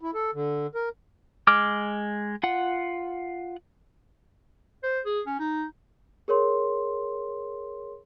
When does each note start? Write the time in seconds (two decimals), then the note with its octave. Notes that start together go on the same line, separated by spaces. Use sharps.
0.01 E4
0.14 A4
0.34 D3
0.75 A#4
1.47 G#3 D6 F6
2.43 F4 F#5
4.83 C5
5.05 G#4
5.27 C#4
5.39 D#4
6.28 G#4 A#4 C#5 C6